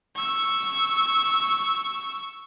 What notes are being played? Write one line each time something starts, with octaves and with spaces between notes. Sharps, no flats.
C#6 E6